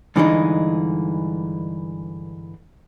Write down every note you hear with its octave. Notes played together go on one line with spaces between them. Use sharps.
G2 D3 E3 G#3 D4 D#4